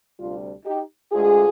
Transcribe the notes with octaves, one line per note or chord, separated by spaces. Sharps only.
D2 C3 G3 D4 F4
D#4 G4
D2 D3 G#3 F4 G#4